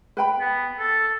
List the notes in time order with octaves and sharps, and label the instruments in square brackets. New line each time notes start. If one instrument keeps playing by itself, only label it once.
[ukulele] B4 G5 B5
[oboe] B3
A4